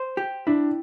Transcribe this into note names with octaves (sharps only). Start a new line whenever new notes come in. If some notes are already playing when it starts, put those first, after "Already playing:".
Already playing: C5
G4
D4 E4